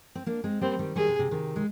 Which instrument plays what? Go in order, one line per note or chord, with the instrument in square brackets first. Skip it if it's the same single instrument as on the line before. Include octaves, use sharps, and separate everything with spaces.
[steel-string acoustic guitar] C4
A#3 D4
G#3 C4
[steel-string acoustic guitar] G3 A#3 [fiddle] C4
[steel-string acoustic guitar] D#3 G3
[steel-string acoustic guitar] D#3 G3 [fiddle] G#4
[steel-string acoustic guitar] C3
C3
C3 D#3
G#3